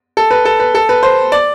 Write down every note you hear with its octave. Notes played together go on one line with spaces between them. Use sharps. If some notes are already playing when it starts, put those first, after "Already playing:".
A4
B4
A4
B4
A4
B4
C5
D5